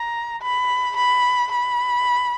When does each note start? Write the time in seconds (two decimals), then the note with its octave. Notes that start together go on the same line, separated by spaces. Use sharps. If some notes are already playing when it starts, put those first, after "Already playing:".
Already playing: A#5
0.42 B5
0.96 B5
1.51 B5